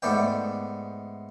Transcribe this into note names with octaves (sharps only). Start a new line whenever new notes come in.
G#2 A3 B3 D5 G5